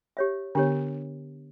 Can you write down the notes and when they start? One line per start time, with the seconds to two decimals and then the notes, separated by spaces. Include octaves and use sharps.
0.17 G4 C#5 E5
0.55 D3 B3 D4 G4 C#5